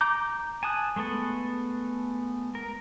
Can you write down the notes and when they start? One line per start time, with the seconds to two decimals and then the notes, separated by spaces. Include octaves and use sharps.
0.01 A#5 D6 G6
0.63 G#5 A5 D#6 F#6
0.96 G#3 A3 B3 A4
2.55 A#4